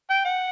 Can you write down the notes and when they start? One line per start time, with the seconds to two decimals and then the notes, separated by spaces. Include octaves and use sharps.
0.10 G5
0.25 F#5